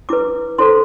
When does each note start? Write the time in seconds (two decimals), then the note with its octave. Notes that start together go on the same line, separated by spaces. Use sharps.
0.09 E4 B4 D6
0.58 E4 A4 C5 C6